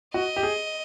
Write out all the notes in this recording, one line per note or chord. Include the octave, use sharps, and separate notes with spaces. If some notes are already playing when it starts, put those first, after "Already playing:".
F#4 D#5
G4
G#4